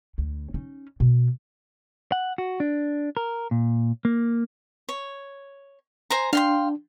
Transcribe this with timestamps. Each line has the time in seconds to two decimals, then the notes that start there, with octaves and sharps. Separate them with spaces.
0.18 D2
0.54 C#4 D#4
1.00 B2
2.12 F#5
2.38 F#4
2.60 D4
3.17 A#4
3.51 A#2
4.05 A#3
4.89 C#5
6.10 C5 G#5 A#5
6.33 D4 F5 G5 C6